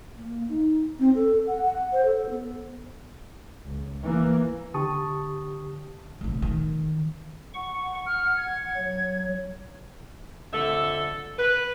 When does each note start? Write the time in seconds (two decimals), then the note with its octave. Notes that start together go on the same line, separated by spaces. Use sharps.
0.17 A#3
0.48 D#4
0.99 C4
1.15 A4
1.47 F#5
1.62 F#5
1.93 C5
2.05 A4
2.30 B3
3.65 C#2
4.03 E3 A#3
4.74 D3 G4 A5 C#6 D#6
6.21 F1 A#1
6.42 D#3
7.54 F#5 C#6
8.06 F#5 F6
8.37 G#6
8.76 F#3
10.51 F2 D3 A4 E5
11.37 B4